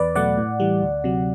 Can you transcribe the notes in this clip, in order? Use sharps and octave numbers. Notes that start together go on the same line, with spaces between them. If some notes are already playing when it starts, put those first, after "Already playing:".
Already playing: E2 B4 D5
B2 F#3 A3 D5 F#5
A2
E3 G3
D2
C3 F#3